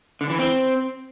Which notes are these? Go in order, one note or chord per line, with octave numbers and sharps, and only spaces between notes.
D3
E3
C4